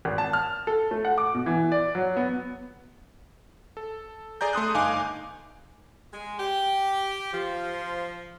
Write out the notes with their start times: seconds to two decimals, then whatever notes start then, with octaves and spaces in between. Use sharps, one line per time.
0.05 G#1
0.18 A5
0.33 F6
0.67 A4
0.91 A3
1.05 F#5
1.18 D6
1.35 B2
1.46 E3
1.72 D5
1.95 F#3
2.16 B3
3.77 A4
4.41 G#4 D5 A#5 G6
4.53 A3 C6 D#6 F#6
4.74 G1 D#4 F5 G#5 D6
6.13 G#3
6.39 G4
7.33 F3